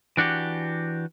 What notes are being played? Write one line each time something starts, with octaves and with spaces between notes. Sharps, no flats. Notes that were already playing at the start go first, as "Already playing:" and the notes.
E3 D4 F#4 G4